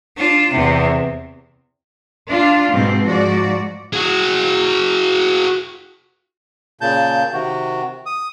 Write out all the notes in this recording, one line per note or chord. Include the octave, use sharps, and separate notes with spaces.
D4 F4
E2 C3
D4 F4
G#2 B2 C4
G#2 F3 F#4 D5
F#4 G#4
A#2 C#3 A5 G6
C3 D#3 F#4
D#6